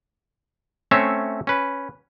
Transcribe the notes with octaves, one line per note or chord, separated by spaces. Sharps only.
A3 C4 C#4 C#5 E5
C#4 B4